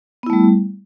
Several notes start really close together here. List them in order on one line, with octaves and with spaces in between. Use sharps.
B3 E4 A3 G3